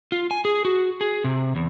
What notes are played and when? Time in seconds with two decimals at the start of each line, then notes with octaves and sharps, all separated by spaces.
0.12 F4
0.31 G#5
0.45 G#4
0.65 F#4
1.01 G#4
1.24 C3
1.56 E2